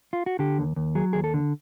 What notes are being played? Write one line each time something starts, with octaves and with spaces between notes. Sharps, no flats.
F4
F#4
D3 G4
D#2
D#2
F#3 G#4
D#2 G#4
A4
D3